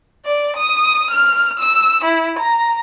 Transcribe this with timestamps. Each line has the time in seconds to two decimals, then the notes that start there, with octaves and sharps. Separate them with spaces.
0.25 D5
0.57 D#6
1.11 F6
1.60 E6
2.05 E4
2.39 A#5